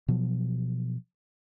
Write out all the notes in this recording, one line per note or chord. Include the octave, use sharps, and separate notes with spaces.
B2 F3 F#3